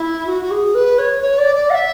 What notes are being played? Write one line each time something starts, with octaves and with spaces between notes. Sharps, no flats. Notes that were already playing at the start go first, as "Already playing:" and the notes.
Already playing: E4
F#4
F#4
G#4
B4
C#5
C#5
D5
D5
F#5
E5